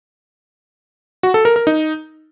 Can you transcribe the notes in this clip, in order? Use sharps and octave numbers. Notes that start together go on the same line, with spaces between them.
F#4
A4
A#4
A#4
D#4